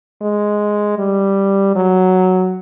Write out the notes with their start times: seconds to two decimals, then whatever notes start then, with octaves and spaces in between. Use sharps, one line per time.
0.21 G#3
0.99 G3
1.76 F#3